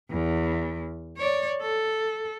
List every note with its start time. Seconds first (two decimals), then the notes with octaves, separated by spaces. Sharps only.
0.11 E2
1.18 C#5 D5
1.62 A4